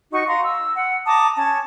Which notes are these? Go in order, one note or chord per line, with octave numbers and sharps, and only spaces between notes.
D#4 F#4 C#6
F5 A#5 C6
E6
F#5
A5 A#5 D6 D#6
C#4 A5